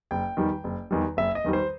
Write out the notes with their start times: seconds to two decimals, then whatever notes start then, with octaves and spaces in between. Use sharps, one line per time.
0.11 F#1 G5
0.37 E2 D#3 G3
0.64 F#1
0.91 E2 D#3 G3
1.17 F#1 E5
1.35 D#5
1.44 E2 D#3 G3
1.53 C5